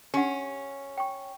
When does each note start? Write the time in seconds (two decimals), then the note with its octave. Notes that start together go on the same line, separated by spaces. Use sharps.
0.14 C#4 G4 F#5
0.98 G5 C#6